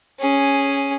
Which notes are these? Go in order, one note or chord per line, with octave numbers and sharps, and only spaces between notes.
C#4 G#4